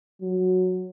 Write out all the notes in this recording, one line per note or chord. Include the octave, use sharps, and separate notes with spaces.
F#3